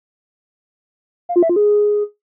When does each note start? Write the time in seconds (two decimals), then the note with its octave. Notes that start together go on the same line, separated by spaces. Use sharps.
1.29 F5
1.36 F4
1.43 E5
1.49 F4
1.56 G#4